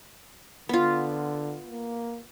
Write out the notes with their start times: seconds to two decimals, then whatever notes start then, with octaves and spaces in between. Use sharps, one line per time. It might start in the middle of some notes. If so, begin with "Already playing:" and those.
0.69 D3 B3 F4
1.67 A#3